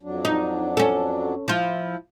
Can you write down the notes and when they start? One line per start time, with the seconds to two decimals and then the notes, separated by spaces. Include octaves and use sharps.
0.03 F2 F#3 D4
0.25 D#4
0.77 C#4 A4
1.48 F3 E4 F4